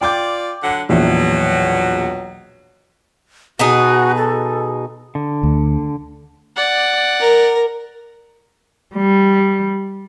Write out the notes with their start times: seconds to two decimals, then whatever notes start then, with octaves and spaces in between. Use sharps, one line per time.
0.01 F4 D5 G5 D6 G6
0.63 D3 F#3 F#5
0.89 A#1 E2 B2 F#3 E5
3.59 B2 D#4 F#4 G#4
4.16 A4
5.15 D3
5.43 D2
6.56 D5 F#5
7.20 A#4
8.96 G3